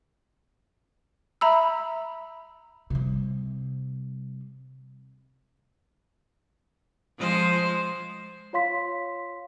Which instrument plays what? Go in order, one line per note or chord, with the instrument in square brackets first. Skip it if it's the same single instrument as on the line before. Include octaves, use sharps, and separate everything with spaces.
[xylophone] E5 A#5 B5 E6
[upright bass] C3 G3
[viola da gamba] F3 G#3 C5
[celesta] F4 C#5 F5 C6 B6